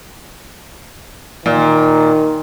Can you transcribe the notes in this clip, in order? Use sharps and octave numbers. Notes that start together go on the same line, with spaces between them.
A#2 D#3